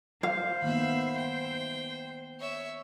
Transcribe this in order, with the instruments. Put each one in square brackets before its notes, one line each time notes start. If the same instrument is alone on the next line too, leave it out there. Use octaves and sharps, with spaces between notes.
[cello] C5 [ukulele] F5
[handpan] D#3 A#3 B3 [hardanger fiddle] E5 B5
[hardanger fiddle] G5
C#5 E5